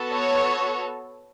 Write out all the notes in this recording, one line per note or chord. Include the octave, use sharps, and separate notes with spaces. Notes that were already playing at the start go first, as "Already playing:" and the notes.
Already playing: B3 F#4 A4
C#5